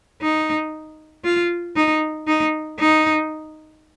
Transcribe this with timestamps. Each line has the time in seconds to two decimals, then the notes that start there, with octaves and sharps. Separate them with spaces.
0.22 D#4
1.24 F4
1.76 D#4
2.27 D#4
2.79 D#4